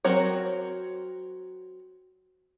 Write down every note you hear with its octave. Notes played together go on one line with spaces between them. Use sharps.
F#3 C4 A#4 C#5